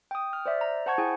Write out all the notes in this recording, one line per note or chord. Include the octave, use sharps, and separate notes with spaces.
G5 D#6
F6
C5 D5 E5
A#5
C5 F#5 A5 C#6 G#6
E4 G#4 G5 G#5